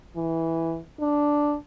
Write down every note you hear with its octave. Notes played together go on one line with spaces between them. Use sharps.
E3
D4